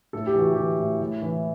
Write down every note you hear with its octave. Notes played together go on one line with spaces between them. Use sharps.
A2 A4
G4
E3 F#4
E3 G4
A2
A2
E3